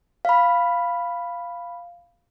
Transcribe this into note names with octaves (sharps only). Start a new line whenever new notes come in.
F5 B5